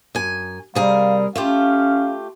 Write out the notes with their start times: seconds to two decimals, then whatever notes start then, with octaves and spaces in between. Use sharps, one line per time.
0.15 F#2 G#5
0.75 C3 G3 G#4 A#4 F5
1.36 A3 C#4 F4 G4 F5